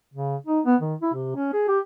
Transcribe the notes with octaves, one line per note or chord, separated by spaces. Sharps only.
C#3
D#4
B3
D#3
E4
C3
C#4
G#4
G4